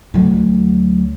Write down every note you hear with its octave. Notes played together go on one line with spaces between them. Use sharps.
D2 F#3